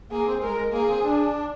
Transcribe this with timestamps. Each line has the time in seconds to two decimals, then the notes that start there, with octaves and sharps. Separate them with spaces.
0.11 A#3 G#4
0.27 C4
0.42 G#3 A#4
0.72 A#3 G#4
0.88 C4
1.03 D4